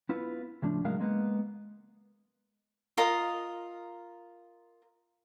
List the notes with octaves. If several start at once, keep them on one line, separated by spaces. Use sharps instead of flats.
B3 E4 F4 B4
C#2 A2 F3 D4
C#2 A2 F#3 G#3 A#4 F5
G#3 A#3 B3
F4 A#4 D#5